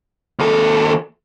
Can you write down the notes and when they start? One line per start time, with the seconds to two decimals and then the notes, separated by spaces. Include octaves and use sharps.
0.39 D#2 A4